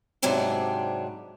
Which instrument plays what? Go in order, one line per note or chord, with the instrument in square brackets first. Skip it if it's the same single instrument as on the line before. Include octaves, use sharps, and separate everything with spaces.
[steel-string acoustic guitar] G#2 C3 F#3 G3 D4